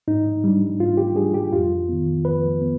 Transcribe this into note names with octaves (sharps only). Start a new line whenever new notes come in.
G#2 D#4
G3 D4
G#2 F4
G4
G3 D4 G#4
G4
F2 F4
D#3 B3
F2 B4
B3